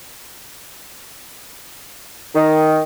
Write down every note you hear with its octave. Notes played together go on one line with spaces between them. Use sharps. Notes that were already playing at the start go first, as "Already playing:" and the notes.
D#3